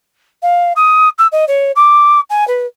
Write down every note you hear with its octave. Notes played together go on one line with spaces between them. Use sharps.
F5
D#6
E6
D#5
C#5
D6
G#5
B4